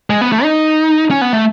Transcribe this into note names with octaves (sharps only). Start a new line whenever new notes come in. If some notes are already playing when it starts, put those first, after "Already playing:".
G#3
B3
A3
D#4
C#4
B3
A3